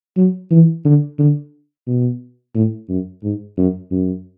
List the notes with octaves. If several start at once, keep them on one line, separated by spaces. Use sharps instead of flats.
F#3
E3
D3
D3
B2
A2
F#2
G#2
F#2
F#2